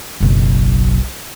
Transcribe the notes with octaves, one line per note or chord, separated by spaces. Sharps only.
F#1 B1